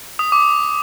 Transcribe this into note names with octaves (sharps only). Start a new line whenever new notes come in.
D#6
D6